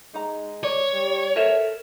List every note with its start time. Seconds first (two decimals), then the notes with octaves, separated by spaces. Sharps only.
0.14 G#3 D#4 A#5
0.64 C#5 D5
0.93 G3
1.36 A4 A#4 C5 E5